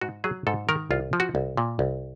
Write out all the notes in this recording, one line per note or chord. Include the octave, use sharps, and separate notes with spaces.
G#2 F#4
F#3 G#4
G#2 A4
D#3 A#4
C2 F4
F3
F#4
C2
A#2
C2